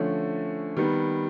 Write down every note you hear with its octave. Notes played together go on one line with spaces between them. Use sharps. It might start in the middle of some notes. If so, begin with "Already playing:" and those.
Already playing: D3 F3 A3 C#4
D#3 G3 B3